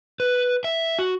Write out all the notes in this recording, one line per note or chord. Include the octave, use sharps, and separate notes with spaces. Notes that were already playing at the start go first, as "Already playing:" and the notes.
B4
E5
F#4